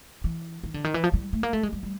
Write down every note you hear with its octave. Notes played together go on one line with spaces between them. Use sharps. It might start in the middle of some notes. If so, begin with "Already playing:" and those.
E3
D#3
D3
D#3
E3
F3
G3
A3
A#3
A3
G#3
G3
G3